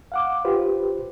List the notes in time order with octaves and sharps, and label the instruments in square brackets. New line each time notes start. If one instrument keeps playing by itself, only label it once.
[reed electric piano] F5 F#5 D6
F4 G4 B4 C5